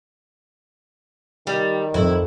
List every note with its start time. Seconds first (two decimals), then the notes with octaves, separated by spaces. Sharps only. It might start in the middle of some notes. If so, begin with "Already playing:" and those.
1.47 D#3 G3
1.94 F2 E4